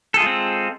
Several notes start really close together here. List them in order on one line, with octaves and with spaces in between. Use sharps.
A4 G#4 F4 G#3 C4